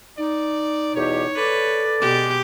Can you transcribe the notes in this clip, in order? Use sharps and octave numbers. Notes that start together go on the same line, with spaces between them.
D#4 D5
E2 B2 G4 C#5
A4 B4 D5
B2 G#3 G4 D6